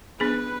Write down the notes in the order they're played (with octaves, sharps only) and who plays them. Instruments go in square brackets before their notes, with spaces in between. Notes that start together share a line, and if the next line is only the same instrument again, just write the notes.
[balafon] B3 D4 G#4 [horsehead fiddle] B4